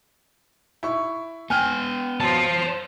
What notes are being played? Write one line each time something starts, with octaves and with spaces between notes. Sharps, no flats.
E4 C#6
B3 G5 G#5 F6
F#2 C5 A5